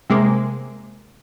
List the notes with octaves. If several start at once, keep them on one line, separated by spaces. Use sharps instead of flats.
C3 G#3 A#3